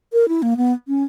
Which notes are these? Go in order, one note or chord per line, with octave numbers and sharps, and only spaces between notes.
A#4
E4
A#3
B3
C#4